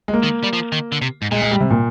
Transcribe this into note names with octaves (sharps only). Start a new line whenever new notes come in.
G#3
A#3
D#3
G3
F3
D#3
D3
C3
G#2
A#2 G#3
G#3
G3
C3
A#2